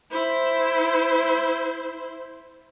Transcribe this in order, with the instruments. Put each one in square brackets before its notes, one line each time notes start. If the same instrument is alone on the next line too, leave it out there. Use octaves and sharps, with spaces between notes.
[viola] E4 C5